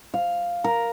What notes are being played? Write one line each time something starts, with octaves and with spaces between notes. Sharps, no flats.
F5
A#4